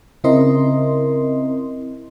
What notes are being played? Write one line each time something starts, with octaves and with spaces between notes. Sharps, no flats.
C#3 C4 E4 A#4 D#5 C6